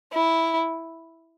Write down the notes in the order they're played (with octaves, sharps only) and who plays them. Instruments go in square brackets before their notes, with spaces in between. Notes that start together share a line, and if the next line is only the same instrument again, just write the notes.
[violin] E4